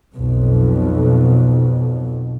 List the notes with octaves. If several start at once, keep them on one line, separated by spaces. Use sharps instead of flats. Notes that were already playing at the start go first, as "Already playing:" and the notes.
B1 F2